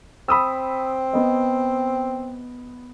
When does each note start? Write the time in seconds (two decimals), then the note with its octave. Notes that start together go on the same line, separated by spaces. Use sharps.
0.29 C4 B5 D#6 E6
1.13 B3 D#5